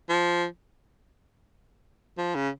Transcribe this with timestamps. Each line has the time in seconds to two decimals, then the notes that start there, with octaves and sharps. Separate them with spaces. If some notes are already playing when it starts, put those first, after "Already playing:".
0.09 F3
2.18 F3
2.35 C#3